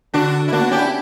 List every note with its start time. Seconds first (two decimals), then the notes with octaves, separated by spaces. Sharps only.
0.14 D3 D4 F#4
0.48 E4
0.53 A#3 D4 F#4
0.61 B3
0.71 C#4 E4 G4
0.81 D4